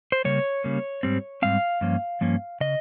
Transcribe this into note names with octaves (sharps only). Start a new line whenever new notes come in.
C5
C#3 G3 A#3 C#5
C#3 G3 A#3
G#2 G3 C4
G#2 G3 C4 F5
G2 F3 A#3 C#4
G2 F3 A#3 C#4
C#3 D#5